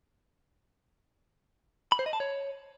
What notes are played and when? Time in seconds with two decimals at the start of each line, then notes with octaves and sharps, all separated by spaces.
1.92 B5
1.99 C5
2.06 D#5
2.13 A5
2.20 C#5